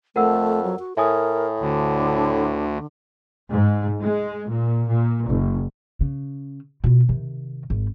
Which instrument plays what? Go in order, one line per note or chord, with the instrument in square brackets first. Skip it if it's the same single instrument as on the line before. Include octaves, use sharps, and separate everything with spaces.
[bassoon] F2 [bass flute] A3 [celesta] A#4 F#5 E6
[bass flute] F#3
F#4
[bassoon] A2 [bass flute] A#4 [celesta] E5 G#5 D#6
[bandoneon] D2 [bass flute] D3
[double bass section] G#2
G#3
A#2
A#2
F#1
[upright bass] C#3
B2 F4
C3 D#3
G#1